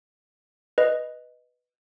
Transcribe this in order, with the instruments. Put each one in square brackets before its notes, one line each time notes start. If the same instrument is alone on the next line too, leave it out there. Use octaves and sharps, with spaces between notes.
[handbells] B4 D#5